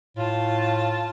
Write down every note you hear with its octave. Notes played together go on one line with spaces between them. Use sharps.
A2 F4 A5